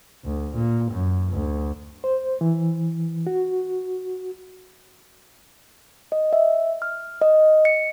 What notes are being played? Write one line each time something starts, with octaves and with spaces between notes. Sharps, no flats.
D2
A#2
F#2
D2
C5
E3
F#4
D#5
E5
F6
D#5
C#7